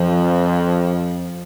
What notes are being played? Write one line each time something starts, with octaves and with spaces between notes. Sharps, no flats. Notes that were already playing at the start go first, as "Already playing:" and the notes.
Already playing: F2 F3